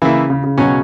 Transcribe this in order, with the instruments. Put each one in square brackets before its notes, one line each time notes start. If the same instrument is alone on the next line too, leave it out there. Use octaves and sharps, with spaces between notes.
[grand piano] C#3 [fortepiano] E3 A#3 E4
[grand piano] C#3
C#3
[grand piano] B2 [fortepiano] F#3 C#4